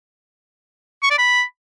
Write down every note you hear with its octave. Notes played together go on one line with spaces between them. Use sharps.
C#6
D5
B5